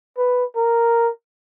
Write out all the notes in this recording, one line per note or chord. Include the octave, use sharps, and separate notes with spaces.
B4
A#4